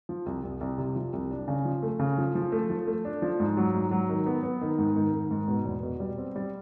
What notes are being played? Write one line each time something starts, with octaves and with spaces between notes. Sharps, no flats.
F3
C2
C2
C2
C3
F3
C2
D4
C#3
F3
A3
C#3
F3
F3
A3
F3
A3
D4
F3
G#2
F#3
G#2
F#3
D#3
B3
B3
D#3
G#2
D#3
D#3
G#2
B2
E2
B2
G3
C4
G3